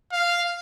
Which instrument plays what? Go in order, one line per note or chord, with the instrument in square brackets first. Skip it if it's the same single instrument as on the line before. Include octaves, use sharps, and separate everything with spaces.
[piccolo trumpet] F5